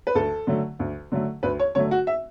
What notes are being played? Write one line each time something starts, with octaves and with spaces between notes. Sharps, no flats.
B4
D2 A4
D3 F#3 A3
D2
D3 F#3 A3
D2 B4
C#5
D3 F#3 A3 C#5
F#4
E5